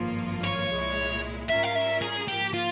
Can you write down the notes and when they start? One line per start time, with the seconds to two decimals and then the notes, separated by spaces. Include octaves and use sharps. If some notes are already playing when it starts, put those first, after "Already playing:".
Already playing: G#1 G2 F3 A#3 F4
0.44 C#5
0.70 C2 A#2 G#3 E4
1.49 G#2 G3 C#4 F4 A#4 E5
1.63 F5
1.75 E5
2.02 G#4
2.28 G#2 F3 A#3 G4
2.54 F4